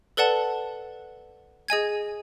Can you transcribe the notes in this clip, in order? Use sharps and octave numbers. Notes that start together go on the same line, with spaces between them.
A4 B4 D5 F#5 A5
G#4 D#5 G#5 G#6